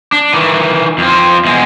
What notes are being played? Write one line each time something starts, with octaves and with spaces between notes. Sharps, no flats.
D4
D#3 E3
F2 C4
E2 G#3